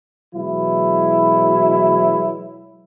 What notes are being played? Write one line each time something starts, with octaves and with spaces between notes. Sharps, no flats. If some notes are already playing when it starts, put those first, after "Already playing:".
B2 E3 F#3 G#3 E4